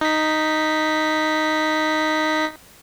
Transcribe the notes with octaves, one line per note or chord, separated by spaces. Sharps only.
D#4 B6